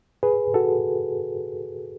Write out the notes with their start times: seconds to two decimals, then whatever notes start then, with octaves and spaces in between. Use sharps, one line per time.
0.23 G#4 B4
0.54 F#4 A4